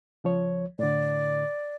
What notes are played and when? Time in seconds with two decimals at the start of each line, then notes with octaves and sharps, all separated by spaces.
0.24 C#2 F3 C#5
0.79 A2 D3 D5